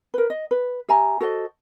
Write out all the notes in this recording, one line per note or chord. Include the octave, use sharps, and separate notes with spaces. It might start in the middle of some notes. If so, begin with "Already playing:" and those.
A#4 B4
D#5
B4
G4 E5 G#5 A#5
F#4 A4 C5 D#5